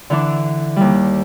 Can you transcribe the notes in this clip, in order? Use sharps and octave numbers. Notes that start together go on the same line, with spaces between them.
D3 E3 D4
D#2 G3